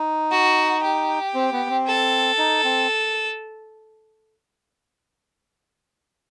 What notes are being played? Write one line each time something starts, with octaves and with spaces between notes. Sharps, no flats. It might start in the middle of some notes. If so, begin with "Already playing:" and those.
Already playing: D#4
F#4
G4
C4
B3
C4
A4
D#4
C4